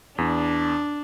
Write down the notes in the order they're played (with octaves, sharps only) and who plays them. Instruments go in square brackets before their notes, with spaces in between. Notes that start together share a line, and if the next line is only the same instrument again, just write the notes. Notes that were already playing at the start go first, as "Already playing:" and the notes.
[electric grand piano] E2 [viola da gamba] D4